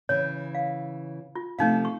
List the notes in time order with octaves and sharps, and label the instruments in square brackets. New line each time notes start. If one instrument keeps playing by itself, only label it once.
[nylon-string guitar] C#3 E3 [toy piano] C#5
[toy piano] F5
F4
[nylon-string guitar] C3 F3 A3 [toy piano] C#4 D#4 F5
[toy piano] C#6